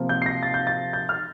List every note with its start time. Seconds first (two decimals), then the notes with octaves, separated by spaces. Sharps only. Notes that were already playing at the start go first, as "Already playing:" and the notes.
Already playing: C3 F3 A#3
0.09 G6
0.22 C7
0.26 A#6
0.43 A6
0.54 G6
0.67 A6
0.93 G6
1.09 F6